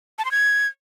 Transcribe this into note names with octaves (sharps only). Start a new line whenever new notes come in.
A5
C6
G#6